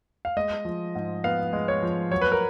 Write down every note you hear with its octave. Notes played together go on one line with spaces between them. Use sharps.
F5
G#3 D#5
F3
G#2
B3 F5
G#3
C#5
F3
F#3 C#5
B4
A#4